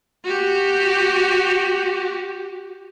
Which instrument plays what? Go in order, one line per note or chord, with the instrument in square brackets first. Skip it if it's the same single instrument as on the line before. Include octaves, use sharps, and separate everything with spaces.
[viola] F#4 G4